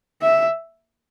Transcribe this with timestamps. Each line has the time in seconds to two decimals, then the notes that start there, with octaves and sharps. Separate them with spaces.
0.22 E5